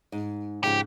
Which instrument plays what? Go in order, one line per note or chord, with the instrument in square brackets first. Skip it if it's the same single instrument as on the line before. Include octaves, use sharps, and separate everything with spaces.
[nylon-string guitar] G#2
[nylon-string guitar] G#2 C#3 F3 [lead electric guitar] G4